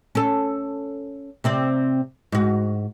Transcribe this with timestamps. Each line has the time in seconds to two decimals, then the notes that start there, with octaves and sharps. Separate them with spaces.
0.15 C#4 A4
1.44 C3 C4 D5
2.32 G#2 F#4